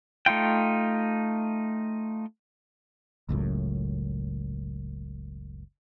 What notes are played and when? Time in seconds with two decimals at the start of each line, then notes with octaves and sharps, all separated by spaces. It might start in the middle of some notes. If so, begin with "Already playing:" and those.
0.26 A3 D#4 F4 G5
3.29 F#1 C#2 F#2 A2